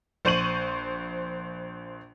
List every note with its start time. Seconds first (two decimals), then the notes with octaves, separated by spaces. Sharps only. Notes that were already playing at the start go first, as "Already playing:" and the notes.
0.25 A#1 C5 C#6 D#7 F#7